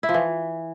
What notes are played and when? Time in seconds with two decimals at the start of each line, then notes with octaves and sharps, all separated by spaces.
0.03 E4
0.09 F3
0.14 E3